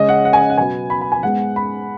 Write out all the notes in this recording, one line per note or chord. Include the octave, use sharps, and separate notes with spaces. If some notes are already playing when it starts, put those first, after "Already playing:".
Already playing: C#3 G#3 C#4 D#5
F#5
F#5
G#5
D#5
F#5
B2 F#3 B3 G#5
B5
B5
G#5
G#2 G#3 B3 F#5
B5